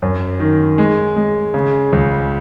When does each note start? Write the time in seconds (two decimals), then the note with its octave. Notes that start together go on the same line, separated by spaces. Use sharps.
0.02 F#2
0.40 D#3
0.78 G#3
1.16 G#3
1.54 C#3
1.93 C#2